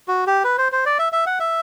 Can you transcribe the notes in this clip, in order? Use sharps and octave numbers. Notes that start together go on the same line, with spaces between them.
F#4
G4
B4
C5
C5
D5
E5
E5
F#5
E5